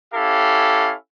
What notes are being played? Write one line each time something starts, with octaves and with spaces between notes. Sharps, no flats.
C#4 E4 G4 A4 F5